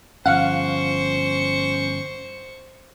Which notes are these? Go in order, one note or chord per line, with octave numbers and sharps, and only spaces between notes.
G1 F3 C#4 C5 F5 F#5 C#6